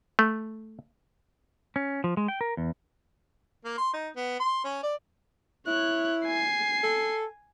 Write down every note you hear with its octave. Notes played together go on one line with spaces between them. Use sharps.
A3
C#4
F3
G#3
G5
A#4
E2
A#3
C6
D#4
B3
C6
C#4
D5
E4 C#5 F#6
G#5 C7
A4